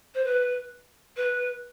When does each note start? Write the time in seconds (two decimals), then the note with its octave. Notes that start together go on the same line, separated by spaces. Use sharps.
0.14 C5
0.24 B4
1.16 B4